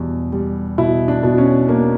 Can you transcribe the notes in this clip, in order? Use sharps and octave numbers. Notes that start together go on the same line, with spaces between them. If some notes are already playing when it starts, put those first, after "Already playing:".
Already playing: E2 B2 G3
G3
B2 E4
D4
B2
C#4
A#3 D4